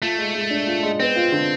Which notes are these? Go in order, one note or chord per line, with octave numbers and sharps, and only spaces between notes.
A3 F4
G#3
G#3
D4
F4
G#3
B3 C4
F4
D3